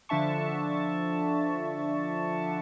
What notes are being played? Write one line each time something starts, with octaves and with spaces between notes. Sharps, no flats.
D3 F3 D4 E5 A5 C#6